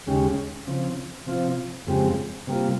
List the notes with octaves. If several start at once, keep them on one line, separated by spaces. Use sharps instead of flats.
D#2 C#3 G#3 C#4 G4
C#3 F3 C4
C3 F3 C4 F4
F2 C#3 G#3 C4 G4
C3 G3 A#3 F4